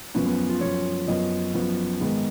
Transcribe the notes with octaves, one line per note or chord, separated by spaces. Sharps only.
F#2 F3 B3 C#4
B3
F4
F#2 F3 B3 C#5
F#2 F3 B3 D#5
F#2 F3 B3
G#2 D#3 G#3 B3